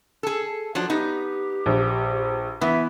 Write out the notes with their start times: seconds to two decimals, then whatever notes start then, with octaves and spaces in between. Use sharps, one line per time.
0.23 G#4 A4
0.75 F3 F#3 D4
0.90 B3 D#4 G4
1.66 A#1
2.61 E3 B3 E5